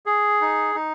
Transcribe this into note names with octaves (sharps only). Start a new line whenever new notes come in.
G#4
D#4
D#4